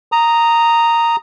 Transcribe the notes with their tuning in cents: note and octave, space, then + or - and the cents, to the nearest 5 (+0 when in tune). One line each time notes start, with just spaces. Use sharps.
A#5 -5 D#6 +0